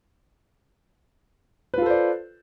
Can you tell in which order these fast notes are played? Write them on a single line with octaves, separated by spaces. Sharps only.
B4 F4 A4 C5 D5